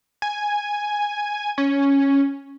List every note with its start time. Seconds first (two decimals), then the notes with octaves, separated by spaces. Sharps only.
0.22 G#5
1.58 C#4